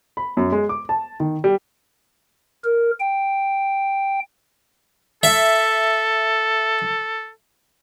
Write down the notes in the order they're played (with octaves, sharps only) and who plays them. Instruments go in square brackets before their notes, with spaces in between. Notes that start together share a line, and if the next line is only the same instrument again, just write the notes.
[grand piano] B5
F#2
G#3
D6
A5
D#3
G3
[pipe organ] A#4
G5
[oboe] A4 [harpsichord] E5